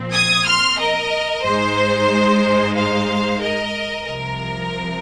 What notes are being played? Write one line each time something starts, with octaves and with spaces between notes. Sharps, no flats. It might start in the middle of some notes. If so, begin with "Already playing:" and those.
Already playing: A#2 F3 C4
D#6 G#6
C6 F6
A#4 D#5
G#2 G#3 D#4 C5
C5 F5
A#4 D#5
C2 C3 F3 A#4